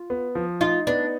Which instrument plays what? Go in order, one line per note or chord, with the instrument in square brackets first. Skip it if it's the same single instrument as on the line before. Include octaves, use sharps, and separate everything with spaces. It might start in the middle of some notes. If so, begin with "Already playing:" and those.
Already playing: [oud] F4
[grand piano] B3
F3
[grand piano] D#4 [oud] F4
[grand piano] B3 [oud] D4